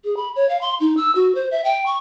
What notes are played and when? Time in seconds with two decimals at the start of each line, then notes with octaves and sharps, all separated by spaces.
0.04 G#4
0.17 B5
0.36 C#5
0.49 F5
0.61 C6
0.80 D#4
0.97 E6
1.15 F#4
1.35 C5
1.51 E5
1.64 G5
1.86 C#6